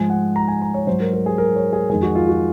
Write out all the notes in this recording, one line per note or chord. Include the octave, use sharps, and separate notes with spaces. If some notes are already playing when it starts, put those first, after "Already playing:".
Already playing: G#2 F3 G#3 G#5
F#5
A#5
G#5
A#5
C#5
G#2 F#3 C5
A#4
A#4
G#4
A#4
C#5
G#4
F2 D#3 G#3 G#4
F#4
F4
F#4